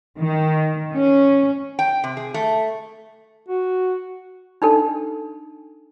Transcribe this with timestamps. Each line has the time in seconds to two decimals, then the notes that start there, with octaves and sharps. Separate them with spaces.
0.19 D#3
0.93 C#4
1.79 G5
2.04 C3
2.17 G#4
2.34 A3
3.48 F#4
4.62 D4 D#4 A4